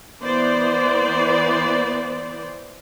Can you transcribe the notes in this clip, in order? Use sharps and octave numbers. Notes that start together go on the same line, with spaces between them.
E3 B3 C5 D5